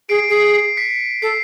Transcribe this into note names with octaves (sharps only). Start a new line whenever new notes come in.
G#4 C7 D7
G#4 C7 D7
B6 C#7
A4 C7